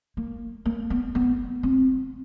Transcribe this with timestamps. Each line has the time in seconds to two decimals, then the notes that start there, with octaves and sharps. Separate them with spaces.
0.17 A#3
0.66 A#3
0.90 B3
1.15 B3
1.63 C4